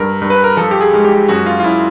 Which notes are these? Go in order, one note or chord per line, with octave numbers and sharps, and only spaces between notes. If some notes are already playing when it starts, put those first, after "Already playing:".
Already playing: G2 A#4
G2
B4
A#4
F3 A4
G4
G#4
G#2
G4
F#2 F#4
F4
F4
F#2 E4